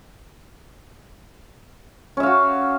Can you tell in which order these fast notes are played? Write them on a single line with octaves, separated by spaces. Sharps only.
C#4 E5 F5 F#4